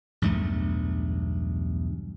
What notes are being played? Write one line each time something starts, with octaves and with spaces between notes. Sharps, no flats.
B1 E2 G2 A3